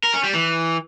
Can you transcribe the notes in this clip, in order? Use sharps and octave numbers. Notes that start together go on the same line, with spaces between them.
A#4
C#4
G3
E3